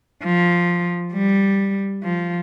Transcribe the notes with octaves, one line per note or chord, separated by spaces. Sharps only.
F3
G3
F3